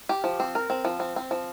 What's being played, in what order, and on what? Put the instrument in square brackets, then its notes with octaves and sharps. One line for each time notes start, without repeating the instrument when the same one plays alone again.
[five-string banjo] G4
F3
C4
A#4
C4
F3
C4
C4
F3